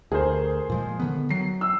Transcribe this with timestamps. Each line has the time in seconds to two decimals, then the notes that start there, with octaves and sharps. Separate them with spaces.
0.12 D2 G#4 A#4 C5
0.70 A#2 F3 G#3
1.00 D3 D#3 B3
1.30 F#3 C7
1.61 E6